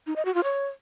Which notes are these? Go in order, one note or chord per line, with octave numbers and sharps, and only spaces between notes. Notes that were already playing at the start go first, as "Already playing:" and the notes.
D#4
D#5
F#4
F4
C#5